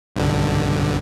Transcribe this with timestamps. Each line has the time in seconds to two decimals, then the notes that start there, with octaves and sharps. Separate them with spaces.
0.16 B1 G2 D3